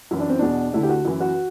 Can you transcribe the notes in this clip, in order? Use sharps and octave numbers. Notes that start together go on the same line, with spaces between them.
F#2 E3 E4
D4
C4
E2 B2 D4
D2 D3 E4
G4
F#4
F#2 E3 E4
F#4